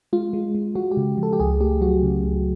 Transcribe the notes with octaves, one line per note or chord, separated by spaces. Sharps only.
G#3 F4
G#3
G#3
G#3 F#4
G4
C#3
F3
A4
G4
C#2 G#4
A3 G4
F#3 F#4
C#3
C#2